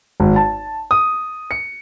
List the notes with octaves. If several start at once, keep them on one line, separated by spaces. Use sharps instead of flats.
G#1
A5
D#6
C#7